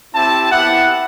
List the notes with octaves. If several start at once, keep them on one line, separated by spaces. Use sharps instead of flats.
C4 E4 G4 A5
B3 E4 G4 F#5